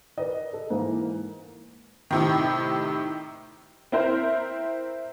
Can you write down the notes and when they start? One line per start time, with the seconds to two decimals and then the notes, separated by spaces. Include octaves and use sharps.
0.18 A#4 B4 D5 D#5
0.53 A4
0.70 G#2 E3 A#3 A#4
2.11 A2 C3 D#3
3.92 C4 E4 A#4 C5